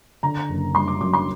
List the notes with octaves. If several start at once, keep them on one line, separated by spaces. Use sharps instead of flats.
D3 A#5
F#1
G3 C6
D6
F#2 D6
C6